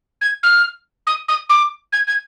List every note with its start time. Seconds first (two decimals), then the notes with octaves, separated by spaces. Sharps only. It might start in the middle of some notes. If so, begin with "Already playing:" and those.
0.21 G#6
0.43 F6
1.07 D#6
1.28 D#6
1.49 D6
1.92 G#6
2.07 G#6